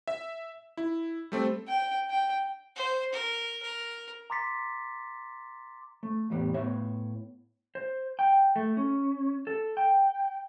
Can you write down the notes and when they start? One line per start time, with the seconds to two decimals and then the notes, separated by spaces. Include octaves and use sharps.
0.08 E5
0.77 E4
1.32 G3 A3 C4
1.67 G5
2.09 G5
2.75 C5
3.12 A#4
3.62 A#4
4.30 A#5 C6 D6 A6 B6 C#7
6.03 A3
6.30 E2 A2 G3 B3
6.54 A2 B3 C#5 E5
7.75 C5
8.19 G5
8.56 A3
8.77 C#4
9.47 A4
9.77 G5